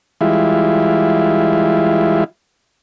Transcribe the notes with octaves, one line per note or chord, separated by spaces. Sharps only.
E3 G3 G#3 E4 F4